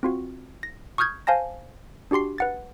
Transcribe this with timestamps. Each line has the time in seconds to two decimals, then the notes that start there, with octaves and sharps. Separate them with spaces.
0.03 C4 F4 F#4
0.63 A#6
0.98 C#6 D#6 F6 G6 G#6
1.27 C5 F5 G#5 A5 A#6
2.11 D4 F#4 G4 C6 C7
2.38 B4 F#5 A6